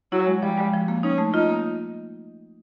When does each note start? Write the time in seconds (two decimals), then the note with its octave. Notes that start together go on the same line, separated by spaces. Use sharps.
0.12 F#3 E4
0.27 G#3
0.43 F3 G3
0.57 G#3
0.74 F3
0.88 A#3
1.03 C#4 D#4
1.18 A3
1.34 D#4 F4
1.49 A#3